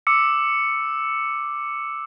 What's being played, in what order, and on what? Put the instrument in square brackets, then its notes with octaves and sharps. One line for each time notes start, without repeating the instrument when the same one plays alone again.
[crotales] D6 E6 C#7